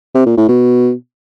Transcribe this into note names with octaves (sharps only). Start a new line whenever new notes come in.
C3
A#2
A2
B2